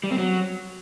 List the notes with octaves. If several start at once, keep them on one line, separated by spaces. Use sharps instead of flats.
G3
C4
F#3